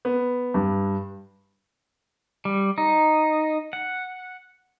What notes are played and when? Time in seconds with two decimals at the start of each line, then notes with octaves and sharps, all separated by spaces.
0.05 B3
0.54 G2
2.45 G3
2.78 D#4
3.73 F#5